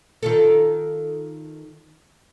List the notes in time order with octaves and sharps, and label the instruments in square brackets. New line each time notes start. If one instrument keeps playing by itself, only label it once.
[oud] D#3 F4 A4